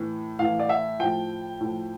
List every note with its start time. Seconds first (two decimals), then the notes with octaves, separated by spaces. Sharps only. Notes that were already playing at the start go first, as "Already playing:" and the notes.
Already playing: A2 E3
0.39 A2 E3 F5
0.59 D5
0.69 E5
1.00 A2 F3 G5
1.61 A2 F3